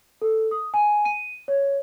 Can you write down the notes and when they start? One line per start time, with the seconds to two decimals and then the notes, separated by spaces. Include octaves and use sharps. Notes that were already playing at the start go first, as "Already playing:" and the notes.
0.22 A4
0.51 D#6
0.74 G#5
1.05 D#7
1.48 C#5